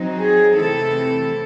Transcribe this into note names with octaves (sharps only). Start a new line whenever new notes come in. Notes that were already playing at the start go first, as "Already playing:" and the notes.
Already playing: F#3 C4 D#4
G#4
C3 E3 A3 C4 E4 A4